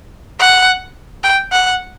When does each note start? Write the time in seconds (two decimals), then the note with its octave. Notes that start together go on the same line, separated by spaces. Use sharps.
0.40 F#5
1.24 G5
1.52 F#5